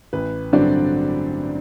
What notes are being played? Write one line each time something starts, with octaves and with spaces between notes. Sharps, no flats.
A1 B4
G2 D3 F#3 C4 D5